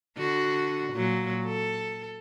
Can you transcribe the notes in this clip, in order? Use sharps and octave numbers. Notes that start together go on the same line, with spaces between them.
D3 F#4
A#2 F#3
A4